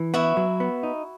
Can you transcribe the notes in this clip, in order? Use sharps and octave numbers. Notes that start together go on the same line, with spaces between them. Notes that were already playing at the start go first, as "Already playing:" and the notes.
Already playing: E3
B3 E4 F#4
F#3
B3
D#4